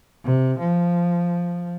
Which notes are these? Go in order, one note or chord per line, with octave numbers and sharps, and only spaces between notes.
C3
F3